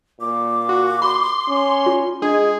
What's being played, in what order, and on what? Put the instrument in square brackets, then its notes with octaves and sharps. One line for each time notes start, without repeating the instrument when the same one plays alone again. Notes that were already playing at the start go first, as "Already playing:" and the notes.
[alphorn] A#2 [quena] D6
[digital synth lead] F#4
[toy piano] B5 [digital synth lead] C6
[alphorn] C#4
[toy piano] F4
[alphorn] G#3 [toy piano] D4 [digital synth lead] G#4